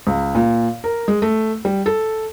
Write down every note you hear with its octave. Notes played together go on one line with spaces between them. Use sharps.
C#2
A#2
A#4
G#3
A3
G3
A4